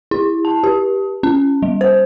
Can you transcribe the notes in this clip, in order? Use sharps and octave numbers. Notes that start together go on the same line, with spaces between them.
E4
A5
G4
C#4
G3
C5